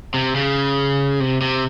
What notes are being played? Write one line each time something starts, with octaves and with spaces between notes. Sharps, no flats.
C3
C#3
C3
C3